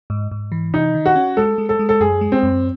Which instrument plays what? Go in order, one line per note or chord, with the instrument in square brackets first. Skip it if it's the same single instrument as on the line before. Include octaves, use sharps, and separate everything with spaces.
[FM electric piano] G#2
G#2
E3
[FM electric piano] C3 [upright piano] D#4
[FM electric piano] D#3
[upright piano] F#4
[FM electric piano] C#4
[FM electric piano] G#3 [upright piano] A4
[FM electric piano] G#3
[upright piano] A4
[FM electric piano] G#3
[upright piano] A4
[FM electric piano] F#2 [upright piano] G#4
[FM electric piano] G#3
[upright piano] C4
[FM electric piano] F#2